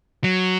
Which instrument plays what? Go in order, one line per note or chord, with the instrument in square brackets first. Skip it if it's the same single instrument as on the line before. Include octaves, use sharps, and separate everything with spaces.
[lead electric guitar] F#3